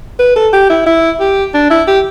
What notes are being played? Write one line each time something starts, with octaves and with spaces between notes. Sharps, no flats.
B4
A4
G4
E4
E4
G4
D4
E4
G4